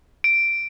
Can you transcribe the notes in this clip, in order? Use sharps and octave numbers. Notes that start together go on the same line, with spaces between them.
D7